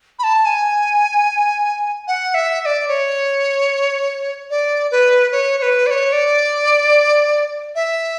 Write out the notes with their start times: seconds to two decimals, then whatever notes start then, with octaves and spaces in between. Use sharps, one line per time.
0.19 B5
0.24 A5
0.46 G#5
2.08 F#5
2.34 E5
2.61 E5
2.66 D5
2.88 C#5
4.50 D5
4.91 B4
5.32 C#5
5.59 C#5
5.62 B4
5.87 D5
5.90 C#5
6.12 D5
7.75 E5